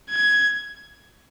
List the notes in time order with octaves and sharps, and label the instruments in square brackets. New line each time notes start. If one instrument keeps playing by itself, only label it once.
[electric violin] G#6